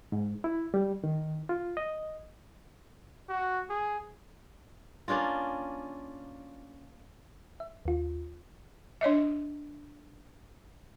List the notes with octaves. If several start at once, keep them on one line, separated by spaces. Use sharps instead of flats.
G#2
E4
G3
D#3
F4
D#5
F#4
G#4
A#3 C#4 D4 F4
E5
D#2 F4
D4 C#5 D#5 E5